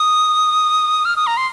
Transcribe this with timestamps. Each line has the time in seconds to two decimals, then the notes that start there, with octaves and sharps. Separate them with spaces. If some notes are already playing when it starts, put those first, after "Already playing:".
Already playing: D#6
1.05 F6
1.16 D#6
1.27 A#5
1.37 C6